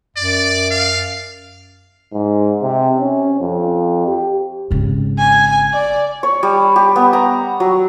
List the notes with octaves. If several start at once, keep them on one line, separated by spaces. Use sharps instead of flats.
F#2 D5
F5
G#2
C3
C#4
F2
G4
G#1 C#3
G#5
D5
C#5
G3
G4
B3
A#5
F#3